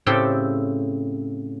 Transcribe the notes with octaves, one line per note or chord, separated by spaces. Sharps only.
A2 C#3 C4 G4 A4 G5